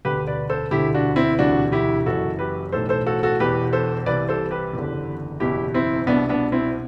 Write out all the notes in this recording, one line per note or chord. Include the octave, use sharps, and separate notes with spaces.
E1 D2 D3 G4 B4
B4 D5
A4 C5
E1 D2 D3 E4 G4
D4 F#4
C4 E4
E1 D2 C3 E3 D4 F#4
E4 G4
F#1 F#2 E3 F#4 A4
G4 B4
B1 A2 E3 A4 C5
A4 C5
F#4 A4
F#4 A4
E1 E2 B2 G4 B4
A4 C5
C2 C3 E3 B4 D5
A4 C5
G4 B4
F#1 E2 D3
F#1 E2 B2 E4 G4
C4 E4
C2 B2 B3 D4
B3 D4
C4 E4